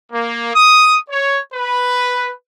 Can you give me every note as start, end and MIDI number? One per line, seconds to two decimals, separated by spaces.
0.12 0.53 58
0.54 0.96 87
1.10 1.39 73
1.54 2.31 71